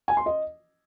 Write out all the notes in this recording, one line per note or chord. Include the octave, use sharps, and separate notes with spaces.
G#5
C6
D#5